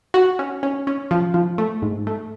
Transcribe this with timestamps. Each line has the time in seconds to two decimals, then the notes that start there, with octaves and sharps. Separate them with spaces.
0.14 F#4
0.39 C#4
0.63 C#4
0.87 C#4
1.11 F3
1.34 F3
1.58 A3
1.82 G#2
2.07 A3